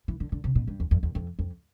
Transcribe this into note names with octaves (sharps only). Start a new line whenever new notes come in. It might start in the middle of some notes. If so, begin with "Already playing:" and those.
E3
D3
D3
C3
B2
G2
E2
F2
E2
F2
F2